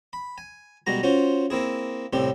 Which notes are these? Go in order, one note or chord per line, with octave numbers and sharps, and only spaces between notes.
B5
G#5
B1 G3 G#3 F#4 A#5
C#4 F4 F#4 C5
A#3 C4 E4 G#4
C2 A2 G3 C4 G4